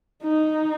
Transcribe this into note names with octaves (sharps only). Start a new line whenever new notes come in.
D#4